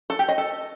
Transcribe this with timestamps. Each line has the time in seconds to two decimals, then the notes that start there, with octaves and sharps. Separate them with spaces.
0.10 A4
0.19 G4
0.28 D#5
0.38 A4